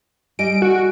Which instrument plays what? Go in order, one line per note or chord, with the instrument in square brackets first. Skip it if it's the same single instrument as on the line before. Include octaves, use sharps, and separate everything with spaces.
[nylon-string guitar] G3 D#5 G#5 [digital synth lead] D7
[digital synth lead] F#4